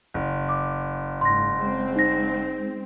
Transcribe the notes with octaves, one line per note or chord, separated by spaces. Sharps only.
F#1
D6
G#2 C6 A#6
G#3 C4
D#4 A#6